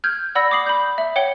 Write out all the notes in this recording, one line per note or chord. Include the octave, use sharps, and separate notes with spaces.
F6 G6 G#6
D5 F#5 B5 E6 A#6
D6 D#6 C7 F#7
B5 G6
E5
C#5 F#5 G5 C#7 G7